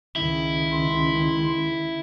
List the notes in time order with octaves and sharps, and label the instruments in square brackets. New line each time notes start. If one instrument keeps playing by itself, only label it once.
[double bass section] C#2 D#3 [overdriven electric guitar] E4
[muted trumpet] C6